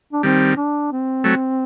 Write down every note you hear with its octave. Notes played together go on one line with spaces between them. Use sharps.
D4
D#3 G3 C4
D4
C4
F#3 A3